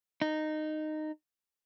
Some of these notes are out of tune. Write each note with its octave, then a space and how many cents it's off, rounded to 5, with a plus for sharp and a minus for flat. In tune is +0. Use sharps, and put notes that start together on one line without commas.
D#4 -15